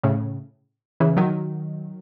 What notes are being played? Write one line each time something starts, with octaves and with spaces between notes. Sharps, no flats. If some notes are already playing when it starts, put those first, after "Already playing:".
A2 C#3
C#3 E3
D#3 F#3